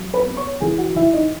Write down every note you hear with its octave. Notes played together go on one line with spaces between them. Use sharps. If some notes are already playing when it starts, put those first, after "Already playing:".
Already playing: F#3
B4 B5
B3
C#5 C#6
E3 G#4 G#5
F#4 F#5
E3 E4 E5
D#4 D#5